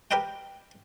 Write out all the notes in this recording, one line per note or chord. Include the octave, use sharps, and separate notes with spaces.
G4 A#4 B4 D#5 G5